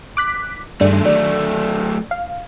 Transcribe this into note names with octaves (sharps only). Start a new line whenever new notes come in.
D6 F#6 B6
G2 D#3 G#3 A3 D4
F#3 A3 D5
F5